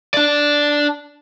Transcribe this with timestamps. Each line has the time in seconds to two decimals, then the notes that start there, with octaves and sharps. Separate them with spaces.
0.14 D4 D5